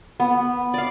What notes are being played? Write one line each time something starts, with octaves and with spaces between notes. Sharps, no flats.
B3
D5 F5